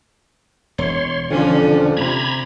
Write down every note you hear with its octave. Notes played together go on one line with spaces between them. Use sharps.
E1 C#5 C6
F2 D3 F3 C#4 D4
C3 A#5 B5 G#6